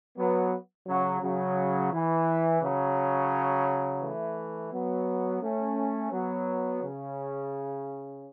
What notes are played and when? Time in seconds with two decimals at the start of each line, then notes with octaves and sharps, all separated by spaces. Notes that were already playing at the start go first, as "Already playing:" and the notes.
0.18 F#3 B3
0.88 C#3 F#3
1.22 C#3 F#3
1.93 E3
2.63 C#3 F#3
4.02 E3 A3
4.72 F#3 B3
5.42 A3 C#4
6.12 F#3 B3
6.82 C#3